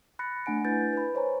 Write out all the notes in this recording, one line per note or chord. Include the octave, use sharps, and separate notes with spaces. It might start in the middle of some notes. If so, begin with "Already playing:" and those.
B5 F#6 A6 A#6 C#7
A3 D4 F#5 G#5 D7
D4 E4 B4 G#5 G6 A6
B4 B5
C5 C#5 G#5 A#5